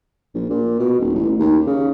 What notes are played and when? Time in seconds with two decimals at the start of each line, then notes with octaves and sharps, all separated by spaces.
0.35 A#1
0.50 A#2
0.79 B2
0.99 D#1
1.14 A1
1.39 D#2
1.67 C#3